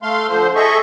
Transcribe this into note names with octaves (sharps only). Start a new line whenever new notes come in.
A3 F5 C6
D3 F3 C5
G#4 A4 D#5 E5 C#6